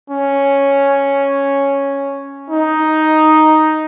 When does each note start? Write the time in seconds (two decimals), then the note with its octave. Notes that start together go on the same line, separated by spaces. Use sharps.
0.10 C#4
2.50 D#4